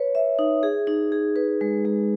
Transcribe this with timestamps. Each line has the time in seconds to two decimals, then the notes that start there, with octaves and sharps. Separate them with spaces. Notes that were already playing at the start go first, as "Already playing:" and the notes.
Already playing: B4 C#5
0.15 E5
0.39 D#4
0.63 G#4
0.87 D#4
1.12 G#4
1.36 B4
1.61 G#3
1.85 G#3